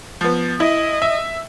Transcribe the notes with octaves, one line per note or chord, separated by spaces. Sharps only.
F3 B3
E4 D#5
E5